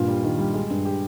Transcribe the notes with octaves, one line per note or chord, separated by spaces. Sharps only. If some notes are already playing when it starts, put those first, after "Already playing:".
Already playing: G2 A#2 F4
G3
D#3
G3
G#3
G2
G4